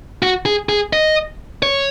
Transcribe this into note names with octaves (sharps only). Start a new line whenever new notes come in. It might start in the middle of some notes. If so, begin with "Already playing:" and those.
F#4
G#4
G#4
D#5
C#5